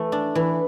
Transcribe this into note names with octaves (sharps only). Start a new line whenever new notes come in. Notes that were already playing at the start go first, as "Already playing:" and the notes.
Already playing: E3 A3
D4
E3